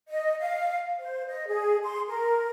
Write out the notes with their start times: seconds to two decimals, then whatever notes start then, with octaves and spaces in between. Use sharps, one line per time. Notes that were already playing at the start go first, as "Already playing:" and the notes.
0.10 D#5
0.40 F5
1.00 C5
1.27 D#5
1.47 G#4
1.84 C6
2.07 A#4